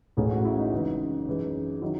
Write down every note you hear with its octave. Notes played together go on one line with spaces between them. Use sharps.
A1 A2 G#3 C#4 G#4
F#4
E4
D#4
G#1 F#2 C#3 E3
F#2 E3 G#3
D#3 F#3 E4